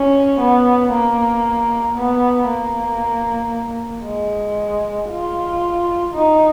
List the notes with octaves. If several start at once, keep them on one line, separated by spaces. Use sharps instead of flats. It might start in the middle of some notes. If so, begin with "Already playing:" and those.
Already playing: C#4
B3
A#3
B3
A#3
G#3
F4
D#4